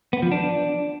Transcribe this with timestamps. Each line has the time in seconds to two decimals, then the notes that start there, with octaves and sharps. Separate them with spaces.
0.13 B3
0.22 F3
0.32 D4